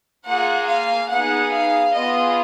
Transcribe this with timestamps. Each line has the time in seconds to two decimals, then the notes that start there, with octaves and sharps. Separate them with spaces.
0.25 A#3 F4 G#4 F#5
0.67 F5
1.10 B3 D#4 G#4 F#5
1.53 F5
1.94 B3 F4 G#4 D#5